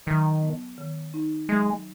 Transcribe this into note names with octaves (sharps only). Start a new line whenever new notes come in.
D#3 F#3
B3
D#3
D#4
F#3 G#3